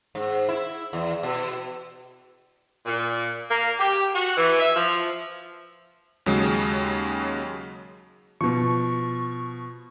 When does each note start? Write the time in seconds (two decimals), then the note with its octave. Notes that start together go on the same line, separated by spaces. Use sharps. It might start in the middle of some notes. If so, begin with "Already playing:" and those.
0.15 G#2
0.49 E4
0.93 E2
1.23 B2
2.86 A#2
3.50 A#3
3.79 G4
4.14 F#4
4.37 E3
4.60 E5
4.75 F3
6.26 D#2 C#3 F#3 G#3
8.41 B2 F3 C#6